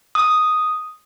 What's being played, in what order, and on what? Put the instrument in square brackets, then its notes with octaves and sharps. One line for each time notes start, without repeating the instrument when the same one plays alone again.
[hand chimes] D#6